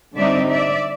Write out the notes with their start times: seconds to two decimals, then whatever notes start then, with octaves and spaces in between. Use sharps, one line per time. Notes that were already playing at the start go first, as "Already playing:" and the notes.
0.16 D3 G3 C4 D#4 D5 E5
0.49 D5 E5